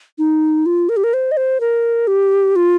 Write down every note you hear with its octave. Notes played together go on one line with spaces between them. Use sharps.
D#4
F4
A#4
G4
A#4
C5
D#5
C5
A#4
G4
F4